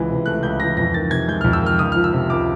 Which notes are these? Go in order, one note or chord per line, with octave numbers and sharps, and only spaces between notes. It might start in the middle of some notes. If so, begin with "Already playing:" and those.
Already playing: C#2 E3 G#3
C3
A3 F#6
C#2 G6
E3 A#6
F2 A#6
D#3 A6
C3 G#6
G#3 G6
F6
F2
E6
D#3 F6
C#2 D#6
F6
F3
E6
C3
C#2 D6